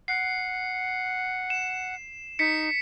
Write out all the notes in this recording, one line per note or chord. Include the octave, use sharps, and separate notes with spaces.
F#5 C7
E7
D#4 B6 C#7